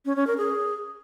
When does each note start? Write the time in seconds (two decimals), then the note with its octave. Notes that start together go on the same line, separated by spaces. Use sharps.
0.06 C#4
0.16 C#4
0.27 A#4
0.38 G#4